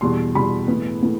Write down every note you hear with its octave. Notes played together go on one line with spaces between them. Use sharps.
E2 B2 G3 C6
E2 B2 G3 B5
A2 E3 B3
A2 E3 B3